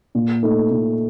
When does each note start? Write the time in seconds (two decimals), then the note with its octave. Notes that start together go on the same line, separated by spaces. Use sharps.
0.15 A#2
0.43 A3 D#4
0.71 A#2